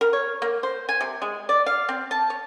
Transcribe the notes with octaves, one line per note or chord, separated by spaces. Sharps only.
A#4
C#5
A#3
C5
G#5
C3
G#3
D5
F5
C4
A5
C#5